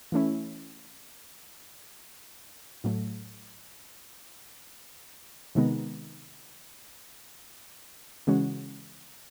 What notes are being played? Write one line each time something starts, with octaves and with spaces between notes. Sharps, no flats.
E3 A3 C#4 E4
A2 F#3 A3
C3 D#3 G#3 B3 D#4
C#3 E3 G#3 C#4 F#4